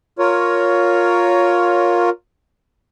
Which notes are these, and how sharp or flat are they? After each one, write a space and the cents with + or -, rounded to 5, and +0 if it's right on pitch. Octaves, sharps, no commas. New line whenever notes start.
F4 +15 A#4 +0 C#5 +10